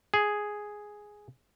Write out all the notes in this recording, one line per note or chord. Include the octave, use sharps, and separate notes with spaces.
G#4